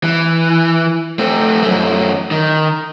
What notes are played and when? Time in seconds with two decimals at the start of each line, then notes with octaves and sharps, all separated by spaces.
0.04 E3
1.19 A3 C4
1.63 F#2 A3
2.31 D#3